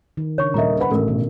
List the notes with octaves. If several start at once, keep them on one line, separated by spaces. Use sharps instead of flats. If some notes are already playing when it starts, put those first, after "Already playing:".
D#3
C#3 D4 C#5 C#6
D#1 A#2 A#4 D#5 E5 A#5
B4 F#5 B5
A1 A4 A#4
B2